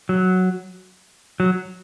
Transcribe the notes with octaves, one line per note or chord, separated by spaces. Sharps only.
F#3
F#3